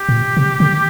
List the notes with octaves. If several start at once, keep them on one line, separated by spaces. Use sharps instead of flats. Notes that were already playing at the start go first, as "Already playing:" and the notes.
Already playing: G4
A2
A#2
C3
D3